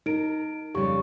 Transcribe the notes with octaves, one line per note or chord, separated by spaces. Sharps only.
D#4 A#4 D7
F2 C#3 G3 G4 C#6